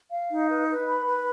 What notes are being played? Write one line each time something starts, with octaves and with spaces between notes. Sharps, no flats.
F5
D#4
B4
B4
B5
B4